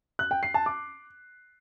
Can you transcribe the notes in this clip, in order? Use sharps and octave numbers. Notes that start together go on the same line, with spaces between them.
F#6
G5
C7
A5
D6